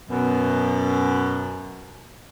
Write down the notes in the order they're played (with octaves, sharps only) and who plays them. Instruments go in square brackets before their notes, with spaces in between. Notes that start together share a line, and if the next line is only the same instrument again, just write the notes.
[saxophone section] F#2 B2